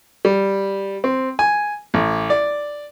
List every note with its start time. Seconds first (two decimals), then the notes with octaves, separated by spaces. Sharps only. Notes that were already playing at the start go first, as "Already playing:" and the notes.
0.25 G3
1.04 C4
1.39 G#5
1.94 A1
2.30 D5